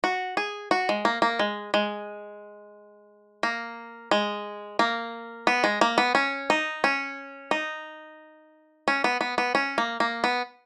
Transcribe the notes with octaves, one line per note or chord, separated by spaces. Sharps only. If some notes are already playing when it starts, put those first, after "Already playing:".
F#4
G#4
F#4
G#3
A#3
A#3
G#3
G#3
A#3
G#3
A#3
B3
G#3
A#3
B3
C#4
D#4
C#4
D#4
C#4
B3
B3
B3
C#4
A#3
A#3
B3